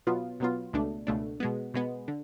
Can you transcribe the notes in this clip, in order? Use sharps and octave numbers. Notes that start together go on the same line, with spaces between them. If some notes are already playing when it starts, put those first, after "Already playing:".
B2 F#3 B3 F4
B2 F#3 B3 F4
C#2 B2 A3 D4
C#2 B2 A3 D4
B2 G#3 B3
B2 G#3 B3
D3